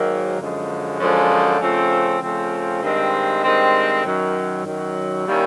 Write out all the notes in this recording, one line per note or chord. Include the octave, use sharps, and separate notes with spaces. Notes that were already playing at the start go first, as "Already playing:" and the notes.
Already playing: G#2 D#3 F#3 A#3
F#2 D3 F3 G#3
F#2 D3 F3 G#3
C#3 F3 A3 C4
C#3 F3 A3 C4
G2 D#3 G#3 C4
G2 D#3 G#3 C4
F#2 D#3 F#3
F#2 D#3 F#3
D#3 G3 A#3 C#4 E4